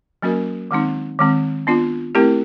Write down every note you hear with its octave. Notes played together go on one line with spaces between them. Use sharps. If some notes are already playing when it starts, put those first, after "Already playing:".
F#3 A#3 C#4 F#4 A#4
D#3 G#3 C4 D#4
D#3 G#3 C4
B3 D4 F4
A3 C4 E4 G4 A#4